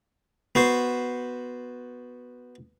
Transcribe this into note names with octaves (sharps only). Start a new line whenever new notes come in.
B3 F#4 C5